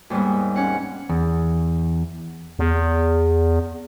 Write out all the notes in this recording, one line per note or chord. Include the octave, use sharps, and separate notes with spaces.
D#2 G#2 G3 A#3 B3
C4 C#4 F#5
E2
E2